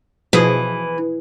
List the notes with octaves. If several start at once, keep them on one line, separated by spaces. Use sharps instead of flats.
B2 E3 F3 G#4